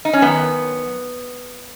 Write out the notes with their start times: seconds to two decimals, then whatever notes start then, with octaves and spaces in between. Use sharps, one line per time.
0.05 D#4
0.13 C#4
0.22 F#2 D#3 B3